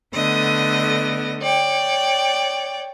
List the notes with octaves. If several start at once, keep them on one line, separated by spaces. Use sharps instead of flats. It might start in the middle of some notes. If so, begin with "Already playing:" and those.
D3 A3 B3 D#5
C#5 D5 G5